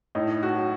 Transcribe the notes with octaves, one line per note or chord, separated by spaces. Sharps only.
A2 D#4
F#4
F#3